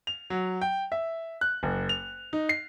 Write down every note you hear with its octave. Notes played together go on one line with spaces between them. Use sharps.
F7
F#3
G5
E5
F#6
F#1
F7
D#4
C7